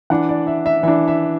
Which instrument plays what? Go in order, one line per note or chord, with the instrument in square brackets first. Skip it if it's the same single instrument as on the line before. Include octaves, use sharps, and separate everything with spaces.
[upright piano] E3 D4 F#5
D5
E5
E5
E3 D4 E5
E5